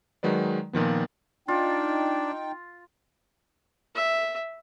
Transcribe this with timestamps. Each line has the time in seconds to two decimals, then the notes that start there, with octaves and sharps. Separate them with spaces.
0.23 D#3 F#3 G#3 B4 D5
0.73 A#2 D#3 F3 B3
1.48 D4 D#4 F4 G5
3.95 E5